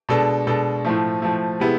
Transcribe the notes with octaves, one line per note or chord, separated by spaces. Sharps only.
B2 G#3 D4 A4
B2 G#3 D4 A4
A2 F3 A3
A2 F3 A3
C3 G#3 B3 E4